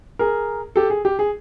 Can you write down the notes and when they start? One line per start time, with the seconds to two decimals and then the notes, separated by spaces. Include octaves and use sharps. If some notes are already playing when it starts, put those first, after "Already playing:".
0.19 G#4 A#4
0.76 G4 A4
0.90 G#4
1.05 G4
1.19 G#4